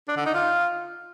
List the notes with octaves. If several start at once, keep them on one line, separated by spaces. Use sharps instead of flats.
D4
D3
D#4
F4